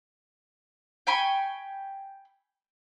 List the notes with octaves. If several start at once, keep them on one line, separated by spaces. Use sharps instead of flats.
G5 G#5 B5 C#6